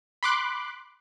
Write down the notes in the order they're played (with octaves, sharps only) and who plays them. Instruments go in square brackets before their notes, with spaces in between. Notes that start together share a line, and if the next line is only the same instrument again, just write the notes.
[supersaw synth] B5 C6 D6 F#6